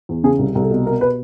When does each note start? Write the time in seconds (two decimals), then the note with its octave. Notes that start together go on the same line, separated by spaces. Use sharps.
0.09 E2
0.24 C#3 G#4
0.39 C2
0.55 C2
0.62 A4
0.70 B2
0.86 B2 A#4
1.01 B4